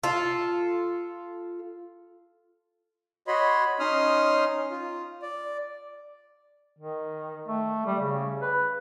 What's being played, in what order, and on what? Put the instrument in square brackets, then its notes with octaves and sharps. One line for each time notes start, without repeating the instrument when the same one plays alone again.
[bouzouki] F4 A4
[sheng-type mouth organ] F#4 C#5 D#5 B5 C6
C#4 D#4 C6 D#6 F6
F4
D5
[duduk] D#3
A3
G3
C#3
B4